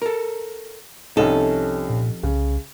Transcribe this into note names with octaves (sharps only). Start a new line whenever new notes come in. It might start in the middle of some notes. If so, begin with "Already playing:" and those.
A4 A#4
C2 F2 C#4 D#4 A4 E7
A#2
C2 C#3